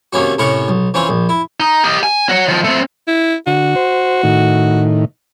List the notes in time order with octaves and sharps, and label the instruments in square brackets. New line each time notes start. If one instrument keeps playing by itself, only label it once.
[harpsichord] C3 D#3 A#3 C#4 F#4
A2 C3 C#4 A#4 F#5 C#6
B1
E3 C4 C#4 F4
A#1
E4
[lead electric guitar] D#4
G4 D#5
G#5
F#4 C#5
D#3 F3
A3 C4
[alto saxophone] E4
[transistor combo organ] D3 [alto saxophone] F#4
[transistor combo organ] C5
A2 D#3